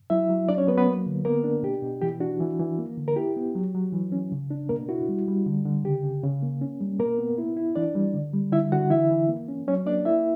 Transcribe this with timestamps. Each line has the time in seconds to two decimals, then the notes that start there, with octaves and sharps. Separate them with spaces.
0.10 F#3 E4 E5
0.29 F#3
0.48 F#3 D4 D5
0.58 C#4 C#5
0.67 F#3 B3 B4
0.77 B3 B4
0.86 A#3
1.07 D3
1.25 A#3 B3 A#4
1.44 D4
1.63 B2 G4
1.82 B2
2.02 E3 G4
2.20 D4 F#4
2.40 E3
2.60 E3
2.79 A#3
2.97 D3
3.08 A#4
3.16 E4 G4
3.36 B3
3.55 F#3
3.75 F#3
3.93 E3
4.12 C#4
4.32 C#3
4.51 D4
4.69 B2 A#3 A#4
4.89 E4 F#4
5.09 G3
5.28 G3
5.46 D3
5.66 D3
5.84 C#3 G4
6.03 C#3
6.23 C#3
6.43 A#3
6.61 C#4
6.81 G3
6.99 B2 A#3 A#4
7.19 B3
7.38 E4
7.57 E4
7.75 E3 D4 D5
7.95 G3
8.14 D3
8.33 G3
8.52 D3 E4 E5
8.72 D3 F#4 F#5
8.90 E3 E4 E5
9.11 E3
9.29 A#3
9.48 C#4
9.68 F#3 C#4 C#5
9.86 A#3 D4 D5
10.05 A#3 E4 E5